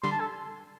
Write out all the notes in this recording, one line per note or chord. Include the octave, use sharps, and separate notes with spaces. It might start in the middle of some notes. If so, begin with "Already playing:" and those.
D3 G3 C6
A5
A4